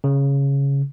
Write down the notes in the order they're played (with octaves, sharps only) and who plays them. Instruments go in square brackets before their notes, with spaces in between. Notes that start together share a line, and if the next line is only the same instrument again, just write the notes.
[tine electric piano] C#3